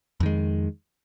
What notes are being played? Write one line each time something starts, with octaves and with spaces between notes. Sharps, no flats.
F2 D#3 G#3